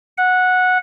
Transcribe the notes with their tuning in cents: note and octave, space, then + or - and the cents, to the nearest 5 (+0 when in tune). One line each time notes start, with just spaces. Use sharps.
F#5 -10